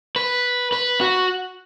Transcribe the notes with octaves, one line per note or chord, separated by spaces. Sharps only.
B4
B4
F#4